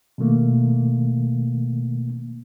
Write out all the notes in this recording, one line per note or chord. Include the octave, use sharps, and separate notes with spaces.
B2 D#3 A3 A#3